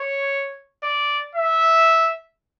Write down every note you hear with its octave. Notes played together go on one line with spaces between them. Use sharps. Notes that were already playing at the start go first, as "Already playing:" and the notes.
Already playing: C#5
D5
E5